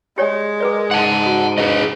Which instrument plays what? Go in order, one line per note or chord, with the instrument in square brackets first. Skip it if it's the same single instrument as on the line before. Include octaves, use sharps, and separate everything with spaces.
[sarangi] G#3 [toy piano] G4 C#5 D5
[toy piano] G#4 B4 D5 [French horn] A#4
[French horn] G#2 [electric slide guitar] F#5 A5
[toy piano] F#4
[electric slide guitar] G#4 B4 D#5